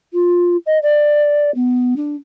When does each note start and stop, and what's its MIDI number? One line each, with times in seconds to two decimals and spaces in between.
0.13 0.57 65
0.66 0.78 75
0.83 1.53 74
1.55 1.95 59
1.97 2.16 62